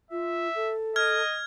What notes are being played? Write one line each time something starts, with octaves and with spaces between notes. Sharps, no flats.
F4 E5
A4
D#5 F6 G#6